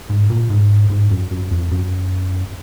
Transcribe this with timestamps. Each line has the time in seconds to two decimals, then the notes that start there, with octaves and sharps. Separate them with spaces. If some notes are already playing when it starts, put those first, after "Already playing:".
0.10 G#2
0.30 A#2
0.50 G#2
0.90 G#2
1.11 F#2
1.31 F#2
1.51 F2
1.71 F#2